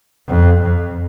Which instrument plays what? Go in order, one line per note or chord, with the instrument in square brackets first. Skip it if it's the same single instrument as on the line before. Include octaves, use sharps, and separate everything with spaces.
[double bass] F2
F2